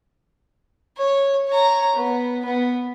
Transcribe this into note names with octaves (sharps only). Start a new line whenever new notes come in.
C#5
C#5 A#5
B3
B3